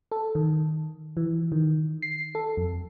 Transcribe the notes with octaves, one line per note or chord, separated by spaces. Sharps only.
A4
D#3
E3
D#3
C7
A4
F2